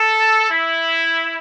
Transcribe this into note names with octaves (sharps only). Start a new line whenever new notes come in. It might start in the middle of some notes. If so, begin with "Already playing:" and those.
Already playing: A4
E4